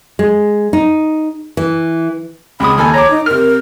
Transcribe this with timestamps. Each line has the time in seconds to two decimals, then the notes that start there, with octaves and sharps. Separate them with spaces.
0.19 G#3
0.73 D#4
1.57 E3
2.60 C#2 G#3 B5 D#6
2.78 D#2 A4 G#5 B5
2.94 C#5 A#5 D6
3.11 D#4
3.26 C3 A#4 F6